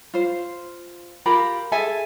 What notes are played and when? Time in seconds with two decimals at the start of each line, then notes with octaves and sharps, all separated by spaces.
0.14 F4 C5
1.26 F4 G4 A#4 B5
1.72 G#4 A4 E5 G#5